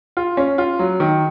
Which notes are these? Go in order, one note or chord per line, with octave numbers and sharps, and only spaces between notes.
F4
C#4
F4
F#3
D#3